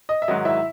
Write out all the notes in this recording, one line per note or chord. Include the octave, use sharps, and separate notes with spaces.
D#5
E5
G#2 D#3 F#3 D#5
E4 E5